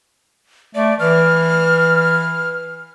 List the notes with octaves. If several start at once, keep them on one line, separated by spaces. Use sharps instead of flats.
A3 D5
E3 F6